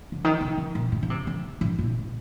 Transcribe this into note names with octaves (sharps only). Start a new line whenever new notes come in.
D3
D#3
C3
C3
A#2
A2
D3
C3
D3
A2
A#2